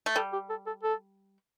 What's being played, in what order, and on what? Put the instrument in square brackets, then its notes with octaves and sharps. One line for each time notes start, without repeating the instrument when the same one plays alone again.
[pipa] A3
[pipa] G3 [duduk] A4
[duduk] G4
A4
A4
A4